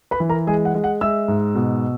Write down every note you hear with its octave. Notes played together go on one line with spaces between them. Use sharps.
B4 B5
E3
A#4 A#5
G#3 G#4 G#5
F#5
G#3
F#5
G#3 E5 E6
G#2
B2